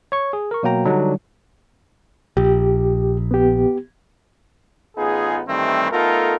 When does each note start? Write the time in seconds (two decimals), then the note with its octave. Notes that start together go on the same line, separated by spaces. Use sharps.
0.12 C#5 C#6
0.33 G#4
0.51 A#4 C#6
0.63 B2 F#3 A#3 F#4 G5 A#5
0.85 D3 F#3 G3 D4 D#4
2.37 A#1 G4
3.31 B3 G4
4.97 A1 B3 D#4 F4 G#4
5.47 G2 D#3 E3 G3 A3 C4
5.91 A3 B3 D#4 F4 A4 A#4